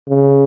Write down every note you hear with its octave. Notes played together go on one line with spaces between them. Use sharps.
C#3